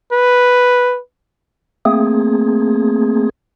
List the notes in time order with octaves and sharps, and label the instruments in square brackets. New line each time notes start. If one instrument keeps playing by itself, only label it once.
[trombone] B4
[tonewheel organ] A3 A#3 C4 G#4